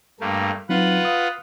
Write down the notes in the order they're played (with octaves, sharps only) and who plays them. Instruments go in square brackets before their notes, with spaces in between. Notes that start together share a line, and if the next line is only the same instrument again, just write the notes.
[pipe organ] G2 A3 A#3
[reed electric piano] F#3 C4 D#4 [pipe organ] F4 B4 F#5
[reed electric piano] F5 D#6